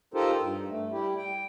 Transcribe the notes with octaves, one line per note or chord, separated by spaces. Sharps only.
D#4 F4 G4 A4 A#4 C5
G2
A3
G3 E4 G4
G5